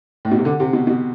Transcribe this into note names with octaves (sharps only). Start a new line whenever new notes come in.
A2
B2
C3
D3
C3
B2
B2